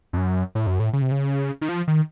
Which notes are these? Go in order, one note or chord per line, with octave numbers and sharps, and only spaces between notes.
F2
F#2
A2
F#2
A2
C#3
C3
C#3
D#3
F3
D#3